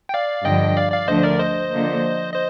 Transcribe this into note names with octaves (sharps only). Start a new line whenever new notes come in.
G5
D5 F5
G2 D3 F3 D#5 G5
D5 F5
D5 F5
D2 D3 F3 A3 C5 D#5
A#4 D5
C5 D#5
D3 F3 A#3
C5 D#5